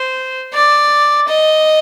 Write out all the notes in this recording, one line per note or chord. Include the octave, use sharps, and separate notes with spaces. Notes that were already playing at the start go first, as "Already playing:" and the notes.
Already playing: C5
D5
D#5